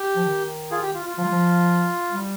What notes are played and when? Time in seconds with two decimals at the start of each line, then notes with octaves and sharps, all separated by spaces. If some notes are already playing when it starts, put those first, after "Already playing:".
Already playing: G4
0.16 F3
0.25 D#3
0.71 F4 G#4
0.83 G4
0.94 F4
1.06 F4
1.17 F3 F4
1.25 G3
1.32 F3
2.11 G3